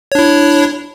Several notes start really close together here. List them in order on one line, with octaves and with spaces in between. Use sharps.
C#5 D4 E4